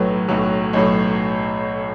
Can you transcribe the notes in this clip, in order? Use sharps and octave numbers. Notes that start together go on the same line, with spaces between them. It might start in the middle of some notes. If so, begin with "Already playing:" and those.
Already playing: B1 A2 F#3 B4
B1 A2 F#3
B1 A2 F#3